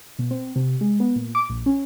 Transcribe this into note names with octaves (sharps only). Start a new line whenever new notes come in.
B2
C4
C3
G#3
B3
A#2
D6
A#1
C#4